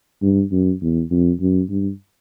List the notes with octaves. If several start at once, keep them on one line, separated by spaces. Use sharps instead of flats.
G2
F#2
E2
F2
F#2
G2